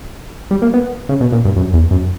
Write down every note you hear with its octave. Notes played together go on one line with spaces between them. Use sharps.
G3
A#3
B3
C#3
B2
A#2
G2
F#2
E2
F#2